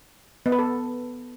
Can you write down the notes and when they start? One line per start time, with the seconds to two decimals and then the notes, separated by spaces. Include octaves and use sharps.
0.46 B3
0.52 B4
0.59 A4